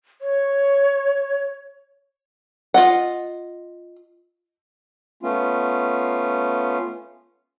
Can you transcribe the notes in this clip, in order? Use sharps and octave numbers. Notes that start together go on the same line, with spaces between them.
C#5
F4 D#5 F#5
A3 B3 C#4 F4